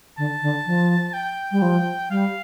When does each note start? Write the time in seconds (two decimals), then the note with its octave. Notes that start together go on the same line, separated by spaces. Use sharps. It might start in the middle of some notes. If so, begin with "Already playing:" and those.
0.18 D3 A5
0.42 D3
0.66 F3
1.14 G5
1.52 G3
1.62 F3
2.10 G3 F5